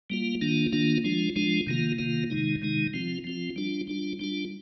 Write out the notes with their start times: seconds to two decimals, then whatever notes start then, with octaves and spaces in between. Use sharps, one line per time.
0.10 G3 A#3 F4
0.41 D#3 A#3 D4 F4
0.73 D#3 A#3 D4 F4
1.04 F3 G#3 D4 F4
1.36 F3 G#3 D4 F4
1.67 C3 D#3 A#3 F4
1.99 C3 D#3 A#3 F4
2.30 C3 D#3 G#3 D#4
2.62 C3 D#3 G#3 D#4
2.93 F3 C4 F4
3.24 F3 C4 F4
3.56 G3 D4 F4
3.87 G3 D4 F4
4.20 G3 D4 F4